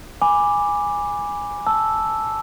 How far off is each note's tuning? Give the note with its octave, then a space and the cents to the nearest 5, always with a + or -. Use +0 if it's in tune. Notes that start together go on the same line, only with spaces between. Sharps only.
G#5 -15 B5 +0 D6 +0
A5 -10 E6 +0